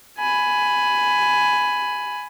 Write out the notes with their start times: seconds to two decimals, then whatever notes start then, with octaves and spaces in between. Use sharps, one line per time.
0.18 G#5 B5